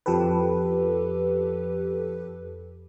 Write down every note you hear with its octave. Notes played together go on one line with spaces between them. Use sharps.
F2 F3 G4 A4 B4